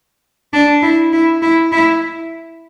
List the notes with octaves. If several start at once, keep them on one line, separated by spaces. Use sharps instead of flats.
D4
E4
E4
E4
E4